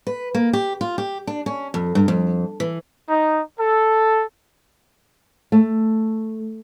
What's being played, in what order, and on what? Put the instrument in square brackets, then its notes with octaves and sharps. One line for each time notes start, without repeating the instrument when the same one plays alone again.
[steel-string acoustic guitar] B4
A#3
G4
F4
G4
D4
C#4
F2
G2
F2
E3
[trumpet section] D#4
A4
[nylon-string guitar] A3